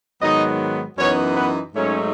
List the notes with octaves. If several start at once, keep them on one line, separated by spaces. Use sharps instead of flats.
G#2 D#3 F#3 B3 D#4 D#5
F#2 E3 B3 C#4 D#4 C#5
B3 B4
G#2 F#3 A3 C#4 D#4 C#5